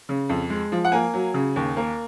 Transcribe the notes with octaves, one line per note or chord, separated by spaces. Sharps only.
C#3
F2
G#3
F3
F#5
A#3 G#5
F#3
C#3
D#2
A#3